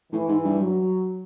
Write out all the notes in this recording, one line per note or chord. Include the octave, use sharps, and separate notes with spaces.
A2 E3
G#2
G2
F#3